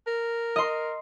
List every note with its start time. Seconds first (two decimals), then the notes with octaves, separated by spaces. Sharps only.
0.07 A#4
0.56 D#5 C6